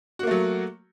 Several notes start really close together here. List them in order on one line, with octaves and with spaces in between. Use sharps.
F#4 A#3 A3 F#3